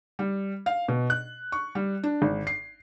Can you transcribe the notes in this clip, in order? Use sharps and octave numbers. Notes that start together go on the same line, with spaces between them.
G3
F5
B2
F#6
C#6
G3
D4
G#1
C7